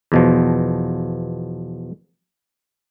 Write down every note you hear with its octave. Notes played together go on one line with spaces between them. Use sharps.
E2 B2 F3